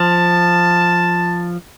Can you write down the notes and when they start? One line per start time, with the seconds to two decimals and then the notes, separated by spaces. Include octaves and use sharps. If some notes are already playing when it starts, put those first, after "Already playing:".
Already playing: F3 A5